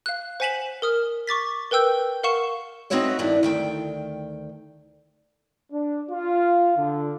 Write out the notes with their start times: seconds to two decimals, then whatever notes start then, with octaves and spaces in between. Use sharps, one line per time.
0.06 F5 F#6
0.40 C5 F#5 G#5 B6 E7 F#7
0.82 A#4 D#6 F6
1.27 C#6 D6 A6 B6
1.71 A#4 B4 G5 E6 G6
2.23 A#4 F5 F#5 C#6 E7
2.90 C4 D#4 F#4 B4 C#5 E5
3.19 G2 D#3 D4 E4
3.43 D2 D#3 G5
5.71 D4
6.10 F4
6.78 D3